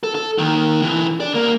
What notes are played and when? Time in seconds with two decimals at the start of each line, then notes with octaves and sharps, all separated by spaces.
0.03 A4
0.15 A4
0.38 D#3 A#3
0.82 B1 E3
1.20 D4 D5
1.33 C2 A#3